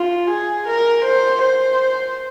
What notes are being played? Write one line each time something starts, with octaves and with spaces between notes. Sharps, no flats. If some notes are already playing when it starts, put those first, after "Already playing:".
Already playing: F4
G#4
A#4
C5
C5